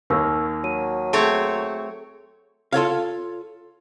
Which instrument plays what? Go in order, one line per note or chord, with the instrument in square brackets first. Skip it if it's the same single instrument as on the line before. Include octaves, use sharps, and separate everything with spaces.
[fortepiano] D#2 A#3 [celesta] A#4 C#6 E6
[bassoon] F#3 [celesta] D#7
[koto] A3 C4 C#5 [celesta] G#4
[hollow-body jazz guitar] F4 A4 C#5 F5